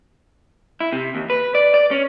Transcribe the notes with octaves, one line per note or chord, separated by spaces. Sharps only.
E4
C3
D#2
B4
D5
D5
C#4